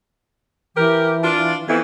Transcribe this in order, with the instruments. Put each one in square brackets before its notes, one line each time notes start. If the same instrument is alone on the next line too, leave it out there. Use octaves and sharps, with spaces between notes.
[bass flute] E3 [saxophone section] G4 A#4
[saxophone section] D4 F4
[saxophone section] F2 E3 [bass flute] B3